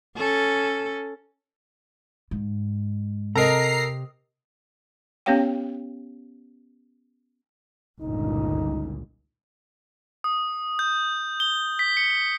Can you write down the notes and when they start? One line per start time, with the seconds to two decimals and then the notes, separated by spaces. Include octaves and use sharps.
0.17 C#4 A4
2.31 G#2
3.35 C3 A4 A#4 D#5 A#5 C7
5.26 B3 C#4 G4 C#5 F5 G5
8.01 G1 C#2 A#2 D#4
10.24 D#6
10.79 G6
11.40 G7
11.79 B6
11.97 C#7